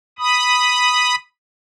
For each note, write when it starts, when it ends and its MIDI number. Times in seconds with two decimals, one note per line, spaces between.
0.19 1.15 83
0.19 1.15 87